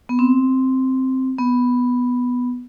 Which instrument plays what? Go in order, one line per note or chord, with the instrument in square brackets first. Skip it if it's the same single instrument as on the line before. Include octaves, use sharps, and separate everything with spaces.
[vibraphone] B3
C4
B3